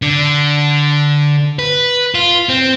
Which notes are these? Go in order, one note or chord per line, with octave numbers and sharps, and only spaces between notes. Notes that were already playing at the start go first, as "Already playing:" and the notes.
D3
B4
F4
C4